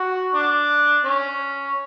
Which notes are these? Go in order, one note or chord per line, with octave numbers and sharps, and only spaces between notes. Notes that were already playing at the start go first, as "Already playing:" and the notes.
Already playing: F#4
D4
C#4